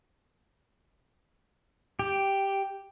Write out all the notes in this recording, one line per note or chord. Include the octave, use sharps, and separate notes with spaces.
G4